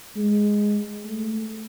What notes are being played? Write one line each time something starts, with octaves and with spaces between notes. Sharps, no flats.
G#3
A3